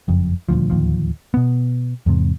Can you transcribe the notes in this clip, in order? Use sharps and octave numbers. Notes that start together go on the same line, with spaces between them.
F#1 F2
D#1 G#1 D2 F3
D1 D#2 F3
B2 B3
E2 G#2 C3